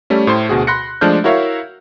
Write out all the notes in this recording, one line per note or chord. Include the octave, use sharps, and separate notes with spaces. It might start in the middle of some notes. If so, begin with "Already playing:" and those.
G3 A3 C#4
A2 C5 C6
D2 B2 F#4 G#4
B5 C6 F#6 A#6 C#7
F3 G#3 A3 D4 F6 G6
E4 F#4 A#4 C#5 E5 F5